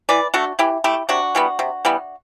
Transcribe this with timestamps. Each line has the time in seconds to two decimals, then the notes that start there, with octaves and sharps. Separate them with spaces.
0.09 E3 B4 D5
0.34 A3 D4 F#4
0.59 E3 E4 G4
0.84 A3 E4 G4
1.09 C3 D4 F#4
1.35 E3 G3 B3
1.59 C3
1.85 E3 G3 B3